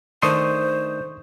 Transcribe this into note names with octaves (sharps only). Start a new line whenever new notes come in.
D#3 A3 D4 C5 C6 C#6 D#6